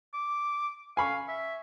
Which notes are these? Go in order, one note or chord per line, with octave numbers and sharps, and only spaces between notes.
D6
F5 G#5 B5 C#6
E5